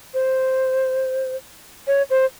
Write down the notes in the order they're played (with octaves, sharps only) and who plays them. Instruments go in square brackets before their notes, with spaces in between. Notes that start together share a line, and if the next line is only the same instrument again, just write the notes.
[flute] C5
C#5
C5